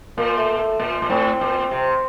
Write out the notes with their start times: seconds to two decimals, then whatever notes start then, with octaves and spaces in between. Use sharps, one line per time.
0.18 A#2 A#3
0.38 A3
0.58 A3
0.80 A#2
1.02 A#2
1.10 A2 C4
1.41 A#2
1.71 C3